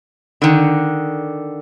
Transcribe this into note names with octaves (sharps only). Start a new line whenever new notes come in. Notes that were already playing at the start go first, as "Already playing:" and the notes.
D3 D#3